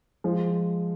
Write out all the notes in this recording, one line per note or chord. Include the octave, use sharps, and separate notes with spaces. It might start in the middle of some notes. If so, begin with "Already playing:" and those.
F3 G#3